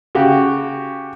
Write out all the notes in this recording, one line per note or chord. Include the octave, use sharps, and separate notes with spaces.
C#3 F#4 G4